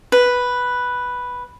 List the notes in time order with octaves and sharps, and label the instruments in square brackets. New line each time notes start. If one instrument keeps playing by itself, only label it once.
[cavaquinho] B4